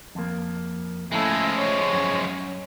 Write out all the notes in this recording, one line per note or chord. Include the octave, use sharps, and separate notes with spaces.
F2 A#3
F3 G#3 A3 C#4 E4 A4
C#5
F#2